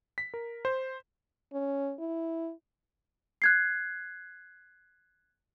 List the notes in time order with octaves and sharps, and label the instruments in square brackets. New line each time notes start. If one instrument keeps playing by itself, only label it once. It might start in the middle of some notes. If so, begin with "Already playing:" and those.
[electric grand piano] B6
A#4
C5
[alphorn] C#4
E4
[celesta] F#6 G#6 C7